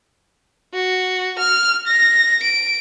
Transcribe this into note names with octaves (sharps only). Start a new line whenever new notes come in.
F#4
F6
A#6
D7